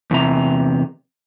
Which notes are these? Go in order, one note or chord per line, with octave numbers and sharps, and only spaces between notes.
E2 C3 A#5